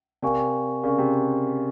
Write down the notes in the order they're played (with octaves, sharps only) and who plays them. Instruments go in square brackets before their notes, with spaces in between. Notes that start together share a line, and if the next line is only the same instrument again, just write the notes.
[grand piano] C3 [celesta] A#4 D5 F5 G#5 C#6
[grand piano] C#3 [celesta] A#4 D5 F5 G#5 C#6
[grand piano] C3